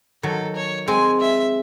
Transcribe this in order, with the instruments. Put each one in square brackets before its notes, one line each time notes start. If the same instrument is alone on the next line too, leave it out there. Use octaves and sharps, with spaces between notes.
[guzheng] D#3 F#3 [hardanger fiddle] A4
[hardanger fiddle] C#5
[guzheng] G#3 C4 [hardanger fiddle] G#5
[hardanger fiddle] E5